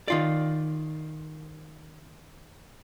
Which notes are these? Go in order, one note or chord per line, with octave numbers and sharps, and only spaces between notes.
D#3 F4 D5